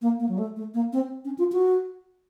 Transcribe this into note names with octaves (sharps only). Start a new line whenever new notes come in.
A#3
A#3
F#3
A3
A3
A#3
C4
C#4
F4
F#4